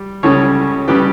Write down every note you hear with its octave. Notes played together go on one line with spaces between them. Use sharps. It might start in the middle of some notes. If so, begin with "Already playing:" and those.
Already playing: G3
C#2 C#3 G3 C#4 A4 C#5
C#3 G3 C#4 G4 B4